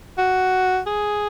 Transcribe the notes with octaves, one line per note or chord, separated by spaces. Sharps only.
F#4
G#4